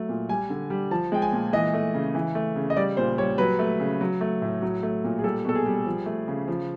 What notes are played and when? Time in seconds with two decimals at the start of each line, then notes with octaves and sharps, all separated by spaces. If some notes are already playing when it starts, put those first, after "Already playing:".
Already playing: F#3 A3
0.09 A#2
0.29 G3 G#5
0.50 D3
0.70 G3
0.91 F3 A5
1.12 G#3 G5
1.22 G#5
1.33 A#2
1.53 E3 D#5
1.74 A3
1.94 C#3
2.15 E3
2.35 A3
2.56 C#3
2.70 D#5
2.77 G3 D5
2.97 A#2 C5
3.18 G3 C#5
3.38 F#3 B4
3.59 A3
3.80 C#3
4.01 F#3
4.21 A3
4.42 A2
4.62 F#3
4.83 A3
5.04 A#2
5.19 G#4
5.24 G3 A4
5.45 B2 A4
5.55 G#4
5.66 G3
5.86 F3
6.06 A3
6.28 C#3
6.48 F3